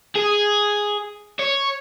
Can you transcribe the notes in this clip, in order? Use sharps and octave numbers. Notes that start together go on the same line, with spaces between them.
G#4
C#5